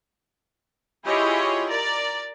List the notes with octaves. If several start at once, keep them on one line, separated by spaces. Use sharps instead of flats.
E4 F4 G4 G#4 C#5 D#5
A#4 D5